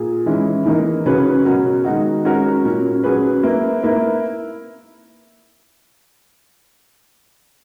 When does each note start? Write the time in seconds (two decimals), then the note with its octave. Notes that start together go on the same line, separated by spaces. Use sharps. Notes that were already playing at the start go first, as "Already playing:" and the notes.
Already playing: A#2 G#4
0.26 E3 G#3 C#4 E4
0.66 E3 A#3 D#4 A#4
1.06 C#3 F#3 C#4 G#4 B4
1.45 B2 F#3 C#4 F#4 A#4
1.85 D#3 G#3 D#4 F#4
2.25 G#3 C#4 F#4 A#4
2.64 A#2 F#3 A#3 C#4
3.04 F#3 C#4 G#4 B4
3.43 A#3 E4 B4
3.83 A#3 E4 B4